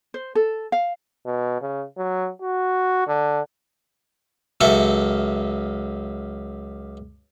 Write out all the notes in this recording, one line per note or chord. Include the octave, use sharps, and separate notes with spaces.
C5
A4
F5
B2
C#3
F#3
F#4
D3
C#2 F#2 A4 E5